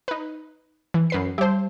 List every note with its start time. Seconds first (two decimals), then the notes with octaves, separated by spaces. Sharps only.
0.08 D#4 B4
0.94 E3
1.10 F#2 B4 C7
1.38 G3 G4 C5 A5